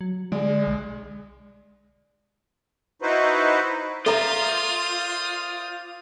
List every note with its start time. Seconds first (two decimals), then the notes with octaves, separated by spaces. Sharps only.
0.01 F#3
0.32 D3 G#3 D5
0.67 B1
3.02 D#4 E4 F#4 B4 C5
4.06 F4 A4 A#4 C5 D5 E5 A#5 D#6